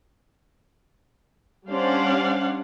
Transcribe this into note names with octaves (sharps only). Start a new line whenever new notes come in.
G3 C#4 D4 C5 F5 F#5